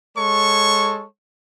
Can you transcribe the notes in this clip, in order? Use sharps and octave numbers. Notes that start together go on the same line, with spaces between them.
G#3 A4 C#5 C#6